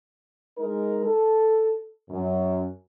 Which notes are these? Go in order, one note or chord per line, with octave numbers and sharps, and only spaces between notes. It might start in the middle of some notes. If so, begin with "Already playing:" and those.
G#3 D#4 A#4
A4
F#2